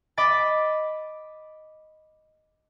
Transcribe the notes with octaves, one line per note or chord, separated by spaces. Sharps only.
D#5 B5 D6 A6 D7